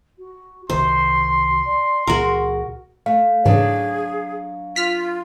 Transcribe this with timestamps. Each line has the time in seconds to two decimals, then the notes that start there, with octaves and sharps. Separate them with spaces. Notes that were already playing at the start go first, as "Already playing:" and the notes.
0.18 F#4
0.70 C2 C3 D#3 F#4 C5 C6
1.65 D5
2.07 C#2 A#2 E3 F#4 G#4 A#4
3.06 A3 F5
3.46 G#2 C#3 E3 F#3 D4 G#4
4.76 F4 F6 B6